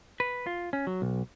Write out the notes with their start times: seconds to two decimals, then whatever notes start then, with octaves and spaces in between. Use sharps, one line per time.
0.20 B4
0.46 F4
0.73 C#4
0.87 F#3
1.02 B1